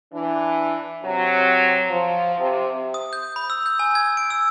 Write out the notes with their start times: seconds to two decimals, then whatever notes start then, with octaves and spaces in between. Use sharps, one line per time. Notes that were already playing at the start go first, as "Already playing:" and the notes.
0.13 E3 D4
1.04 C3 F#3
1.89 F3
2.39 C3
2.94 D#6
3.13 G6
3.36 B5
3.50 E6
3.66 G6
3.79 G#5
3.95 G#6
4.17 D7
4.30 E6